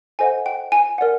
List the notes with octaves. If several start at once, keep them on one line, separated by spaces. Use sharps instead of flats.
A4 C5 D#5 F#5 G#5
G5
G#5
A#4 D5 F#5